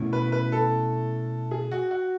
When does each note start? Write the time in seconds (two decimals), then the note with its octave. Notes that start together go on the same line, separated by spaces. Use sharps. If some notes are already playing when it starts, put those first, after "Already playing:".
Already playing: B2 A3 C#4 E4
0.13 B4
0.32 B4
0.52 A4
1.51 G#4
1.71 F#4
1.91 F#4